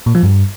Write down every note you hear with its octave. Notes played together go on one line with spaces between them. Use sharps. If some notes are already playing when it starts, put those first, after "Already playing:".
A#2
F3
G2